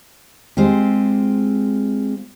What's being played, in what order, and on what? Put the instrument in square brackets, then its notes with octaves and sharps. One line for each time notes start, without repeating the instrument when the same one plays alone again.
[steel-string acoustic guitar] G#3 C4 F4 G4